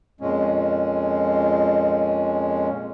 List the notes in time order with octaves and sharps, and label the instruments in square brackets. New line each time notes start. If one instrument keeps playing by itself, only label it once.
[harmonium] F2 A#2 G#3 C#4